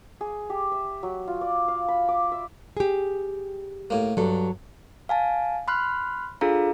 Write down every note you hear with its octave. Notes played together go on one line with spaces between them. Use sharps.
G#4
G4
E5
F#3
F4
D5
F5
B5
D6
E5
G4 G#4
A2 A#3
G2 F#3 A4
F5 G#5 A5
B5 C6 F6 F#6
D4 F4 G#4 A4 F5 A#5